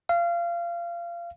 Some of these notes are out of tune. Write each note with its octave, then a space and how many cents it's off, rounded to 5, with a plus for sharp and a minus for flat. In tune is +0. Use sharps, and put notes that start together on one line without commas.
F5 -25